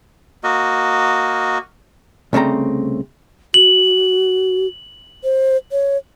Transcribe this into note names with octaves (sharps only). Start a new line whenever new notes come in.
A#3 F#4 D#5
C2 C#3 A3 C4 A#5
F#4 F#7
C5
C#5